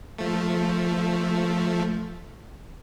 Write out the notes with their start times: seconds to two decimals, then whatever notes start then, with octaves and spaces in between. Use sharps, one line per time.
0.18 F3 A3